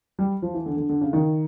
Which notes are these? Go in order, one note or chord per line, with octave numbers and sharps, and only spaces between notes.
G3
F3
E3
D3
D3
D3
C#3
D#3